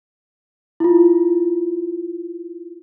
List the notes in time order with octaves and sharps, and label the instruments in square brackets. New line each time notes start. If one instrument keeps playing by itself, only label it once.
[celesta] E4 F4